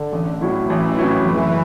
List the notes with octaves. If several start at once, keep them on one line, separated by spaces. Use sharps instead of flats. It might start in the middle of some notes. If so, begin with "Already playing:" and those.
Already playing: D3
A1
A2 F#3 C#4 E4
A1 E3
A2 F#3 C#4 E4
F#1 E3